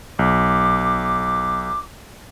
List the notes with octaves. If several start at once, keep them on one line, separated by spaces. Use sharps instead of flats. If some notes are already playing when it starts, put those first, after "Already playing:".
B1 D6